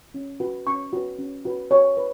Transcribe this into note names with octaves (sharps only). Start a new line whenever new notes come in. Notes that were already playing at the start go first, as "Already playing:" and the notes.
C#4
F#4 B4
C#4 C#6
F#4 B4
C#4
F#4 B4
F#4 C#5
B4